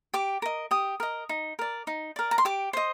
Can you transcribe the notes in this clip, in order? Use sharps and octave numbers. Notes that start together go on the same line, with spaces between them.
G4 D6
A#4 D#5
G4 D#6
A#4 D#5
D#4
A#4 D5
D#4
A#4 D5
A#5
C6
G4 D6
C5 D#5